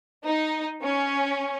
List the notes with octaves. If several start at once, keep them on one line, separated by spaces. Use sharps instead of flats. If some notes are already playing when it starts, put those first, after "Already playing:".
D#4
C#4